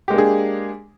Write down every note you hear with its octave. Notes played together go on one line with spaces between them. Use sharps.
G#3 A#3 D4 G4 G#4